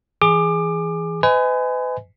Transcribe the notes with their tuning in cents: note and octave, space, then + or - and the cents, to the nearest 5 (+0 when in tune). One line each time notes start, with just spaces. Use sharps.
E3 +0 G#4 +0 D6 +25
B4 +40 D#5 +20 G#5 +0